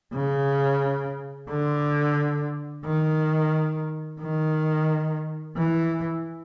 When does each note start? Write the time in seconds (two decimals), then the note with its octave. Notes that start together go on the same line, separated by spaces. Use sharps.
0.13 C#3
1.49 D3
2.85 D#3
4.21 D#3
5.56 E3